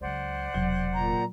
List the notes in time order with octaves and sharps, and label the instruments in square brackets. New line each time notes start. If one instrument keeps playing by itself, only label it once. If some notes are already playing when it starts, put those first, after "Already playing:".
[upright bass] C#2 F#3 [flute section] C5 D5 F#5
[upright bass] E1 C3 [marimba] F#3
[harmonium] A#2 A#5